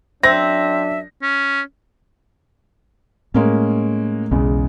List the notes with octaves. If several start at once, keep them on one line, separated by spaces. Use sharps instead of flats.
F#2 F#3 C4 D4 E5 A#6
C#4
A2 G#3 A#3 C#4
B1 E2 C#3 G#3